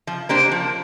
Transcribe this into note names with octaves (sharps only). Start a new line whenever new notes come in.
F3
A#3 D4 G4 C5
F3